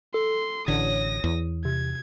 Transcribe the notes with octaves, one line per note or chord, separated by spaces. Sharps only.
A4 C6
A1 D3 C#5 D#6 A#6
E2
C3 G#6